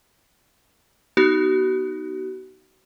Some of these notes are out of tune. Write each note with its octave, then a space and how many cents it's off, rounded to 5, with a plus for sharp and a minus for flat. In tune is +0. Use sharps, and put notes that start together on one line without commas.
B3 +0 D#4 +0 F#4 +40